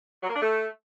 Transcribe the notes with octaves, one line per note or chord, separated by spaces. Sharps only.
F#3
A#3
D4
A3